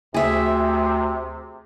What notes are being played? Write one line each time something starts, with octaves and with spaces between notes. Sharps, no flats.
D2 C3 G#4 E5